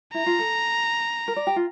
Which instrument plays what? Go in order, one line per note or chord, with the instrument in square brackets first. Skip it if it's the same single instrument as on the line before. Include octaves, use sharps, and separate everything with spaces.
[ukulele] E4 [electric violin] A#5
[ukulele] F4
A4
A#4
D5
G4
F4